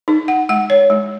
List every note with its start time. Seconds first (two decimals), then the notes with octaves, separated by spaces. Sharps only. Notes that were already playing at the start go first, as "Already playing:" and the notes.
0.08 D#4
0.28 F#5
0.49 G#3 F#5
0.70 C#5
0.90 G#3